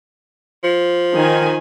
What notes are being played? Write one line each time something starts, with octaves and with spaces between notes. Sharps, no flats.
F3
D#3 G#5